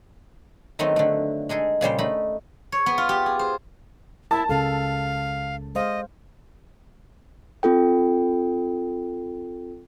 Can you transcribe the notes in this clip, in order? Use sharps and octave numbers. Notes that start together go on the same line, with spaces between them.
D#3 F#3 A3 B3 C4 D#4
D3 A3
G#3 D#4 G#4 A4
A#2 C#3 G3 C5
A3 D#4 B5
C#5
B3
F4
G4
G#4
C5
E4 A#4 A5
C#2 C#3 A4 F5
G#3 C5 D#5 F5
C4 F4 A4 G5